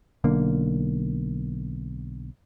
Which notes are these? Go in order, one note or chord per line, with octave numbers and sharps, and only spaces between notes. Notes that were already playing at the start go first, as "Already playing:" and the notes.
B1 D3 A#3